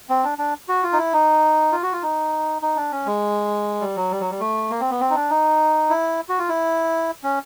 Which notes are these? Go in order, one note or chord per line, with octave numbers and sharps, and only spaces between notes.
C4
D4
D4
F#4
F4
D#4
E4
D#4
F4
F#4
F4
D#4
D#4
D4
C#4
G#3
G3
F#3
G3
F#3
G3
A3
A#3
C4
B3
C4
D#4
D4
D#4
E4
F#4
F4
E4
C#4